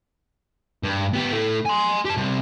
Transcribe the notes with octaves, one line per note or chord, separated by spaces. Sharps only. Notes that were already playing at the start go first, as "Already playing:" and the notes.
G2
B3 G4
A2 A3
G#5 C6
G4 A5
C3 G3